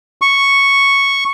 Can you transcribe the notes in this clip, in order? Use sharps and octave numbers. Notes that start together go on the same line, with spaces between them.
C#6